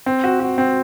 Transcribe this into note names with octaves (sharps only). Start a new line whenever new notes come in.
C4
F#4
F#4
C4